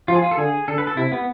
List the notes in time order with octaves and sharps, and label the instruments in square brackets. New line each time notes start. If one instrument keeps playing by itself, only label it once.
[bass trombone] F3 [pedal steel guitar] F4
[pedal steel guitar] G#4
F4
A4
[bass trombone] D3 [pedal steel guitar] G#4
[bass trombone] D3 [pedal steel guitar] A4
[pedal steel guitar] B4
A4
[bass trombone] C3 [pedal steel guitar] E4
[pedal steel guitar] B3